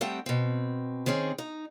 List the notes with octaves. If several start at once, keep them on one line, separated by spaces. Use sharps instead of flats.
G3 A3 C4 F#5 G5
B2 C4
D#3 C4 C#4 G#4
D#4